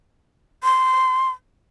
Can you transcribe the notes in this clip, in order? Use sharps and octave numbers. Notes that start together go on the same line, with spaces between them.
C6